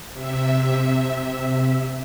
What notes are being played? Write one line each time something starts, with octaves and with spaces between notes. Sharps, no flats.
C3 E5